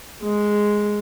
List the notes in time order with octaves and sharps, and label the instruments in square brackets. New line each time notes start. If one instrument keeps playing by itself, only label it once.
[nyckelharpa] G#3